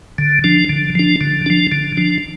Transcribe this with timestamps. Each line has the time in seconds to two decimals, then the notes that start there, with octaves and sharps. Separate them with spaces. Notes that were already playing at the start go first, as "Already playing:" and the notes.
0.18 D3
0.44 F3 D4
0.69 D3
0.95 F3 D4
1.21 D3
1.46 F3 D4
1.72 D3
1.97 F3 D4